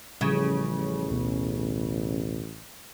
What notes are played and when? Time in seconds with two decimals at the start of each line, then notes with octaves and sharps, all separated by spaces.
0.21 A1 C#3 F3 G3
1.10 D2 B2 B3